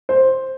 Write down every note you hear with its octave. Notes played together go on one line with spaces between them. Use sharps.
C5